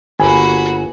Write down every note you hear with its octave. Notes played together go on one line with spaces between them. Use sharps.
G1 A#3 F#4 G#5 B5